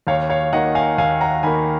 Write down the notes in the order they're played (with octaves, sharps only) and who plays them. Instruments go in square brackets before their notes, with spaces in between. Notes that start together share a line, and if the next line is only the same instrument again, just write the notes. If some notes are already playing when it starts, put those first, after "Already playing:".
[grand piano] D#2 C#5 F5
C#5 F5
D#3 A#3 D#5 F#5
F5 G#5
D#2 F5 G#5
F#5 A#5
D#3 G#5 B5
A#3